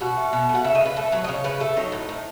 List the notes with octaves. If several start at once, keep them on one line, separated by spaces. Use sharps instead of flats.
B2 F#4
A3
B2
A3
F#5
C#3 E5
D#5
C#3 B4
A3 A4
F#3 B4
D#5
C#3 C#5
C#3 B4
A3 A4
F#3 D#4
A2
A2